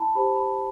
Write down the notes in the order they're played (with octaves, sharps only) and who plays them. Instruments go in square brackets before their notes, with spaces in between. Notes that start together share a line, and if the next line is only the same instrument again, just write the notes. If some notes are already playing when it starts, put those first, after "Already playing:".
Already playing: [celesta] E4 A5 B5
G4 C5 B5
B5